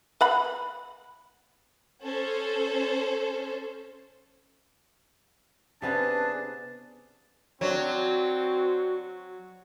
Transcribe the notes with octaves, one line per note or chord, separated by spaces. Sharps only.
B4 F#5 B5
C#4 A4 C5
C3 B3 C#4 D4 G#4 B4 A5
F#3 C4 D4 F#4 C#5